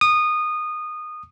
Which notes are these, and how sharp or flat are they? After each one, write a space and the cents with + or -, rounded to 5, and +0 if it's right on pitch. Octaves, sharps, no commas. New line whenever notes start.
D#6 -20